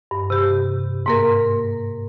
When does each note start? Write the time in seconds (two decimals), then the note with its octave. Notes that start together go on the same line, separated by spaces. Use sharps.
0.11 G2
0.30 C3 G4
1.06 G#2 A#3 A#4